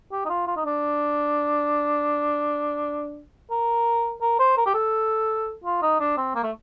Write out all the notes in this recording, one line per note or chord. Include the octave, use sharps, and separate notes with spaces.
G4
D#4
F4
F4
D#4
D4
A#4
A#4
C5
A#4
G4
A4
F4
D#4
D4
C4
A#3
A3